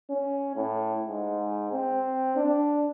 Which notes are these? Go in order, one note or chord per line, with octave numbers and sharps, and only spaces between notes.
C#4
A2
G#2
C4
D4